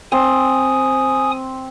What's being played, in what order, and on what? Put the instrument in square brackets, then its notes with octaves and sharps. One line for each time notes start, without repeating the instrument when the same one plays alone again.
[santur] C4 [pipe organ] G#5 D#6